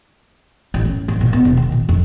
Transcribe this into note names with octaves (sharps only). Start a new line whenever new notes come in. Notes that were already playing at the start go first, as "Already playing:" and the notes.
A1
C#4
G#1
A#2
B3
E1
D#3
A#2
F2